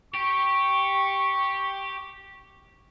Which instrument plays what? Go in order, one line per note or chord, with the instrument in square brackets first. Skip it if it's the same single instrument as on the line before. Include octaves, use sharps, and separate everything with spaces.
[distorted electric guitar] G4 [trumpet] C#6